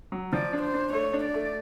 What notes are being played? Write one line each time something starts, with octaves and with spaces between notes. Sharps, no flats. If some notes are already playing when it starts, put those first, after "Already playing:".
F#3
F3 D5
D4
C5
D4
A3 C#5
D4
D5
A3